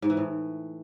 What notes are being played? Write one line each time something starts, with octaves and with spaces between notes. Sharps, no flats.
G#2
E3
A2